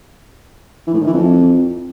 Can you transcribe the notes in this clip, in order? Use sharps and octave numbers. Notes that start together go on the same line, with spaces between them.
E3
A2
D#3
E3
F2